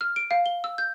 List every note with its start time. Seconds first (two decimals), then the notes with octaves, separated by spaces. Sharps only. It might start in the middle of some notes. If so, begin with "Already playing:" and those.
0.01 F6
0.16 D7
0.31 F5
0.46 G7
0.64 E6
0.78 G6